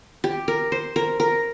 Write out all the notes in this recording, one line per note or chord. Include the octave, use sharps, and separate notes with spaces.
G4
A#4
C5
A#4
A#4